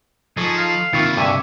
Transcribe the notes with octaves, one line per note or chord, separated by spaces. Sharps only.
F3 D#4 G#4 A4 C#6
F5
C3 D#3 A#3 E4 F4 E5 C#6
G2 D3 G4 E5 G#5 C#6 D6